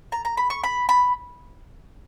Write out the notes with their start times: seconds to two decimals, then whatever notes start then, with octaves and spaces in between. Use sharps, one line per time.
0.12 A#5
0.25 A#5
0.37 B5
0.50 C#6
0.64 B5
0.89 B5